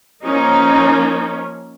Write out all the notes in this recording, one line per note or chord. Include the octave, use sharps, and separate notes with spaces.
F3 A#3 C#4 D#4